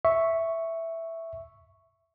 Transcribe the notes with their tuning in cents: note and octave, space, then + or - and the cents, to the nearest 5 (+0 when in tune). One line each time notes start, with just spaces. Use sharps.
E5 +0 C#6 +0